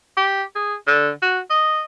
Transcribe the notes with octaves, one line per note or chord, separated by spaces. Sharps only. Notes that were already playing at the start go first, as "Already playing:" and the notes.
G4
G#4
D3
F#4
D#5